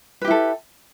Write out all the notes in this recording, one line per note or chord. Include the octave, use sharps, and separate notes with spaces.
E4 G4 A4 B4